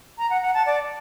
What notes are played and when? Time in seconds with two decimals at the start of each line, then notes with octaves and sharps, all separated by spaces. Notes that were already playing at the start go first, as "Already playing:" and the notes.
0.18 A#5
0.30 F#5
0.42 F#5
0.54 A5
0.66 D5